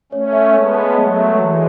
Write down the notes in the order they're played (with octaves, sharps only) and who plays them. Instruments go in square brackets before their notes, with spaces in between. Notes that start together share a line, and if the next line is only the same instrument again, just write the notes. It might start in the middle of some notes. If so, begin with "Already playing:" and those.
[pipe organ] A3 C#4 [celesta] C#5
[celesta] E5
[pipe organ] G#3 B3 [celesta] C#5
[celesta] A5
[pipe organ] F#3 A3 [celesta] C#5
[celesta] E5
[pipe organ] E3 G#3 [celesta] C#5